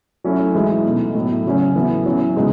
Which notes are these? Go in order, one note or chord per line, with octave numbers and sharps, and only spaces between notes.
F#3 A3 C#4 E4
E3 G#3 D#4
B2 A3 D#4
A2 F#3 A3 E4
C#3 F#3 C#4
A2 E3 B3
F#3 C#4 E4
C#3 G#3 B3 D#4